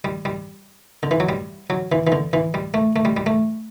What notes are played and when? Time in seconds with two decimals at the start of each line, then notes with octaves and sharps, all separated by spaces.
0.05 G3
0.25 G3
1.03 D3
1.11 E3
1.20 F#3
1.29 G3
1.70 F#3
1.92 E3
2.07 E3
2.12 D3
2.33 E3
2.54 G3
2.74 A3
2.96 A3
3.05 G3
3.17 G3
3.26 A3